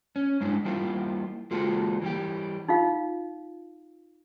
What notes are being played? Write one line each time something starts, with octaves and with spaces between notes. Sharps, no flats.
C#4
G2 G#3 D4 E4
G3 A#3 E4 F4
G#3 A#3 F4 F#4 A4
E3 G3 G4
D#4 F4 F5